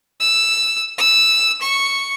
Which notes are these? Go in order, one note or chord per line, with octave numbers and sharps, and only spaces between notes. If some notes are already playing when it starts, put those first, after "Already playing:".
E6
E6
C#6